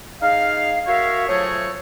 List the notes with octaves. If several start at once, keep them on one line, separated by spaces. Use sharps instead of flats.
D#4 G#4 F5
F#4 A#4 C#5 E5 F5
F3 F#3 A3 G#4 C#5